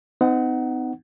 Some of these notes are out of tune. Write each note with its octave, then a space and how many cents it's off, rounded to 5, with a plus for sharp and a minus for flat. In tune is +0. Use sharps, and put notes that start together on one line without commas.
C4 -45 D#4 +0 F#5 +10